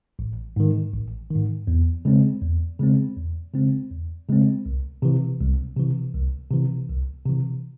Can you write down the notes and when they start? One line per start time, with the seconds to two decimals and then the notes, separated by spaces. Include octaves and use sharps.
0.19 A1
0.56 G#2 D#3
0.94 A1
1.30 G#2 D#3
1.67 E2
2.05 C#3 G#3 C4
2.42 E2
2.80 C#3 G#3 C4
3.16 E2
3.54 C#3 G#3 C4
3.91 E2
4.28 C#3 G#3 C4
4.66 C2
5.02 C3 E3
5.40 C2
5.76 C3 E3
6.14 C2
6.51 C3 E3
6.88 C2
7.26 C3 E3